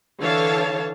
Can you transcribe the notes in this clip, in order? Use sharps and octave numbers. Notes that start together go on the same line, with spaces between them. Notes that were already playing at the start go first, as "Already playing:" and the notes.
D3 E3 A4 C#5 F5 A5